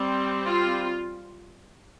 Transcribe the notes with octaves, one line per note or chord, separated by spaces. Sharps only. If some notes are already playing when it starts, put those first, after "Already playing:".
Already playing: G3 C4
F4